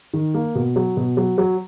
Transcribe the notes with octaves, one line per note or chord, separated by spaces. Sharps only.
D#3
A#3
B2
F#3
B2
F#3
F#3